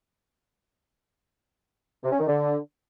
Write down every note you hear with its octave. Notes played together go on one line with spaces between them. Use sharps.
C3
C#4
D#3
D3